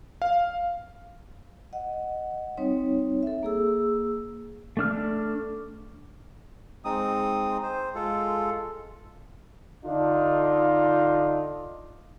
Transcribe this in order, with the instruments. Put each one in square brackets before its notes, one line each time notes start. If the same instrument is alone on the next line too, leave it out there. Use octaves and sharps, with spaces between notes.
[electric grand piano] F5
[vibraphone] D#5 F#5
G3 C4 D#4 C#5
A4 E5
A#3 G#4 E6
[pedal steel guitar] A3 D4 F6
[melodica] G#3 C4 D#4 D#6
C5
G#3 F4 A4
[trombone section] D3 D4 D#4 F4